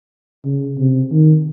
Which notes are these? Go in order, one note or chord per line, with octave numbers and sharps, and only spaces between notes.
C#3
C3
D#3